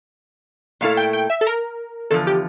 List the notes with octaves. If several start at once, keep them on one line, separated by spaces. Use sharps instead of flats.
A#2 A3 E4 A4 F5
G5
G5
E5
A4
A#4
E2 D3 F3 A4
G4